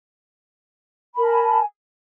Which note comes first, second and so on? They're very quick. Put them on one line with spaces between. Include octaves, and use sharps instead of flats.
B5 A#4 A5 G#5